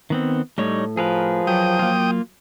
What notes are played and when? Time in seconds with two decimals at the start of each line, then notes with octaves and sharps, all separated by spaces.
0.10 D#3 B3 C4
0.58 A2 G3 D#4 C#5
0.97 F3 G#4 A#4 B4
1.47 F#3 G5 D#6
1.79 A#3 F4